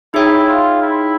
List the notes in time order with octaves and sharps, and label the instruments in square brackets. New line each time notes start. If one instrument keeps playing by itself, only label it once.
[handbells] D#4 G#4 C#5 E5 G5 [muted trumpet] E4
[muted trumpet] F4
E4